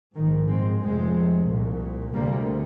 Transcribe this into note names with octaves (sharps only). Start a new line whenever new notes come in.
A#1 G#2 D#3
G#3 C4
F1 F2 C3 G#3 C4
C2 A#2
D2 C3 G3 A#3